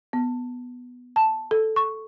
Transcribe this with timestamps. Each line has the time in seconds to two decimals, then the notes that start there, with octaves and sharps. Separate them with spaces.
0.13 B3
1.16 A5
1.51 A4
1.76 C#6